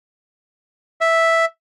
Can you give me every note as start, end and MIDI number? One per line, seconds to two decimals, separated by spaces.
1.01 1.45 76